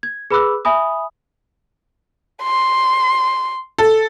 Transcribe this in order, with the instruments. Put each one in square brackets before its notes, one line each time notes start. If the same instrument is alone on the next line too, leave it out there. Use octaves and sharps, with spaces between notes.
[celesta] G#6
G#4 B4 B5 D6 E6 F#6
E5 G#5 B5 D#6
[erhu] C6
[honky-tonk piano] A4